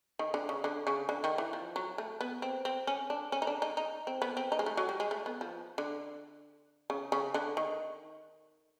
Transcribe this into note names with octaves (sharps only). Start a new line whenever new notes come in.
D#3
D3
C#3
D3
C#3
D3
D#3
E3
F3
F#3
A3
B3
C4
C4
C#4
D4
C#4
D#4
D4
D#4
D#4
C4
B3
C4
D#4
G#3
A3
F#3
G3
G#3
A3
B3
F3
D3
C#3
C#3
D3
D#3